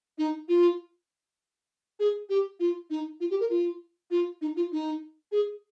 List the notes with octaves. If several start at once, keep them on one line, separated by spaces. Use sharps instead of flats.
D#4
F4
G#4
G4
F4
D#4
F4
G4
A#4
F4
F4
D#4
F4
D#4
G#4